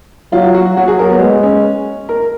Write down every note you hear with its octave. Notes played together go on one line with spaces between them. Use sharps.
F#3 F4
F#4
F#3 F#4
G#4
A#4
B3
G#3 B3
C#4
A#4